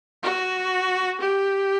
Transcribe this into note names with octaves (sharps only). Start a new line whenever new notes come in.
F#4
G4